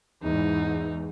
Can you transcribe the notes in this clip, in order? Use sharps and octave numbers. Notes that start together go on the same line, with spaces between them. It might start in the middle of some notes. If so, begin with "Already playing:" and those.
E2 G#2 D#4